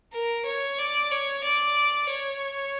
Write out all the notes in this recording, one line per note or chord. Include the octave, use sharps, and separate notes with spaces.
A#4
C#5
D5
C#5
D5
C#5